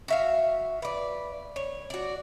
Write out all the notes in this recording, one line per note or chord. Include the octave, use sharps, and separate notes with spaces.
F#4 E5 F5
B4 D5
C#5
F#4 D5